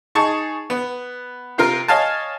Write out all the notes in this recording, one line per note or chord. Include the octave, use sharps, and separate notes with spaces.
D#4 G#4 A5 C#6
B3
C3 F4 A#4 F6
C#5 D#5 F5 G#5 A5